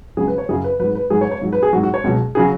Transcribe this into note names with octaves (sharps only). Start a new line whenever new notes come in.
C#2 C#3 F#3 G#4
B4
C#5
F#2 C#3 F#3 G#4
B4
G#2 F#3 B4
B4
G#2 F#3 G#4
C#5
C#5
G#2 F#3
B4
G#4
G#2 F#3 F#4
F#4
C#5
C#2 B2 F#3
C#3 F#3 G#4